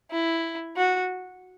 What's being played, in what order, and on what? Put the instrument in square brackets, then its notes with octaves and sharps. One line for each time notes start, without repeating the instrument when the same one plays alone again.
[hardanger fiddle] E4
F#4